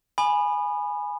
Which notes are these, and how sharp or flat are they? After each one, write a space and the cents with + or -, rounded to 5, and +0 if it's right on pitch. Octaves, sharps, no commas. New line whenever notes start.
G#5 +0 B5 -5 D#6 -40